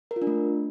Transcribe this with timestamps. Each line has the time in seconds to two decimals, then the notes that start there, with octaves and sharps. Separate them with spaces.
0.11 A#4
0.16 F4
0.22 D4
0.27 A3